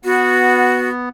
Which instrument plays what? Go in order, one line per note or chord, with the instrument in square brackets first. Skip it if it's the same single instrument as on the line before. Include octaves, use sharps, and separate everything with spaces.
[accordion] B3 [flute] F#4